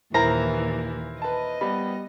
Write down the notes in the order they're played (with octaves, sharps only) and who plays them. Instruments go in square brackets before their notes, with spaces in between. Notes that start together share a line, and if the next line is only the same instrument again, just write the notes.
[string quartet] D#2 A#2 E3 [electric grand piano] E4 A#4 C5 [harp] A#5
[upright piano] B4 A5 [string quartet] D#5
[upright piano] G3 B3 B5